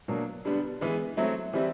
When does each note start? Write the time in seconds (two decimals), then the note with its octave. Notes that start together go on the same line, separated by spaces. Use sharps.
0.08 B2 F#3 A#3 D4
0.45 D3 G3 B3 D4
0.81 E3 G#3 B3
1.17 F#3 A3 C4 E4
1.53 E3 G3 C4 E4